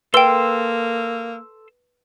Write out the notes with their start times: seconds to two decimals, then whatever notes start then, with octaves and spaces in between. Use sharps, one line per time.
0.14 A#3 A4 B4 G5 C6 E6 G7